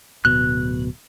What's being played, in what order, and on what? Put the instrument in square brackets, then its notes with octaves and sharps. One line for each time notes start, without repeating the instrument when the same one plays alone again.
[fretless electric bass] D1 B2 [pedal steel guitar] F#6